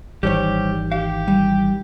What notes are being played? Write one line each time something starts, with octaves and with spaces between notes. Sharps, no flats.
G#1 D#3 E3 G3 G4 C5 C#5
G4 F5
G3